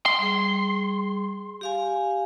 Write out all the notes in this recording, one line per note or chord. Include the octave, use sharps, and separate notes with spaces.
C6
G3 G#4
G4 F5 G#5